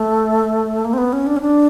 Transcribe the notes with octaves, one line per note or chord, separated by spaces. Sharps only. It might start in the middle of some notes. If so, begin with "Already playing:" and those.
Already playing: A3
A#3
C4
B3
C#4
D4
C#4
D4